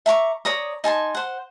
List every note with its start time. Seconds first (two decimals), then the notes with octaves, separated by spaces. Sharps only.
0.06 E5 A#5 C#6 D6
0.45 C#5 D5 A#5 D#6
0.84 D#4 G#5 A5 C6
1.15 C5 F#5